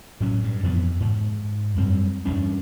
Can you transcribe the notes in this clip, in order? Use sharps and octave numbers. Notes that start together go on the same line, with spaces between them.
A2 F#3 C#4
G2
F2 E3 A#3 B3
G#2
F#2 G3 C4
E2 G2 C#4 D4